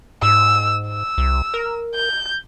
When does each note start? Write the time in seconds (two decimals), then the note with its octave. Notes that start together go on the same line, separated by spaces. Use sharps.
0.22 G#2 E6
0.88 E6
1.18 C2
1.54 A#4
1.95 G6